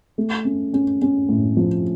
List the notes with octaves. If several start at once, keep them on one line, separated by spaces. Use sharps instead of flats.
A3
C#4
C#4
C#4
A2
F3